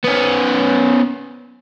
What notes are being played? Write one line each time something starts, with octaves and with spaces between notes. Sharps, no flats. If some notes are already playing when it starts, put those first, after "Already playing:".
B3 C#4